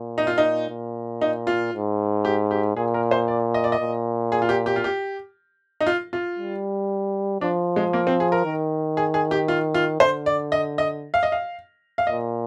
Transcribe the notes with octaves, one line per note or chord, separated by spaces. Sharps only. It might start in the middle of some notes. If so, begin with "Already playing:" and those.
Already playing: A#2
D#4
F4
D#4
A#2
D#4
F4
G#2
G4
G4
A#2 G#4
A#4
C5
D5
D#5
D5
D#5
A#2
G#4
F4
G4
G4
F4
G4
D#4
F4
F4
G3
F3 D4
G#3
A#3
C4
G#4
A#4
D#3
G#4
G#4
G4
F4
F4
D3 C5
D5
D#5
D#5
F5
D#5
F5
F5
A#2 D#5